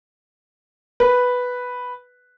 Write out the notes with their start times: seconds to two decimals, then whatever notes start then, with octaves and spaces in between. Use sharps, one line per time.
1.00 B4